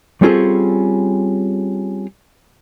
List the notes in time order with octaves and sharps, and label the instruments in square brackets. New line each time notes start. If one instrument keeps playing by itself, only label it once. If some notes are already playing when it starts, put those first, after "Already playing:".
[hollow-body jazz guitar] G3 C4 C#4 F4 G#4 A4